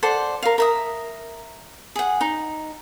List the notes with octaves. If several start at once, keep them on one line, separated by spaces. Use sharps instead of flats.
A4 C5 D5 F#5
A#4 F5
A#4 E5 D#6
G#4 F#5
D#4